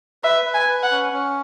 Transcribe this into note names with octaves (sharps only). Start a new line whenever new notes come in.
B4 E5
B4
G#5
B4
F#5
C#4
C#4